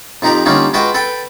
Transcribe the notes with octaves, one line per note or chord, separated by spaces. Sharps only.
F2 F3 D#4 G4 A#5
D3 G3 A#3 C#4 D#4 F4
G#3 F4 F#4 B4 G5
A4 B4 G5